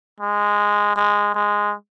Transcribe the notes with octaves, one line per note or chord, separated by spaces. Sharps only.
G#3
G#3
G#3